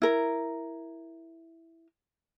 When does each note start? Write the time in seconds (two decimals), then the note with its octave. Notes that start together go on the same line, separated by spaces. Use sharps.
0.02 E4 A#4